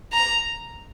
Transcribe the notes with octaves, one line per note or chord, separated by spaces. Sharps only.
A#5